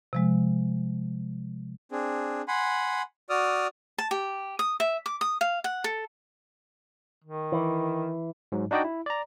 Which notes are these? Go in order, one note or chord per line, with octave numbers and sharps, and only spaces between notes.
C3 F3 G#3
C4 D4 G#4
F#5 G#5 B5 C6
F#4 D5 D#6 F6
A5
G4
D#6
E5
D6
D#6
F5
F#5
A4
D#3
E3
G#2 F#3
D4 D#4 F#4 D5 D#5 G5
E4
D5 A#5